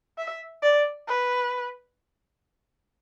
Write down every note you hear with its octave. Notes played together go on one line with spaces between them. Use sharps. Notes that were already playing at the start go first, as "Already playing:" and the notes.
E5
D5
B4